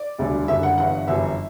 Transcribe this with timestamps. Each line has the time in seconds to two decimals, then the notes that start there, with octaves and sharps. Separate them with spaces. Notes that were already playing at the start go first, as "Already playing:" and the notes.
Already playing: D5
0.19 E1 D2 D3 G3
0.48 F#1 F#2 D3 G3 E5
0.63 F#5
0.78 G1 G2 E3 F#5
1.07 G1 F#2 E3 G3 E5